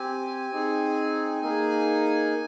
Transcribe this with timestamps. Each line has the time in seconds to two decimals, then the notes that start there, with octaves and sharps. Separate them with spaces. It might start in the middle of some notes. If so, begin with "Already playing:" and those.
Already playing: C4 G4 G#5
0.50 C4 D#4 G#4
1.42 A#3 D#4 G#4